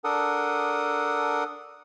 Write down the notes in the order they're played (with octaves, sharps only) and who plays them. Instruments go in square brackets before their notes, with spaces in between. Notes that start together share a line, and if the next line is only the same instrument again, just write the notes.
[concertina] D4 A4 A#4 F#5 D#6